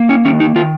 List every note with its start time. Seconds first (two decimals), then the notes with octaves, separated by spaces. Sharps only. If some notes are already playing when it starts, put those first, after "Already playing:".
Already playing: A#3
0.09 C#4
0.25 D#3 C#4
0.40 D#4
0.55 D#3 F4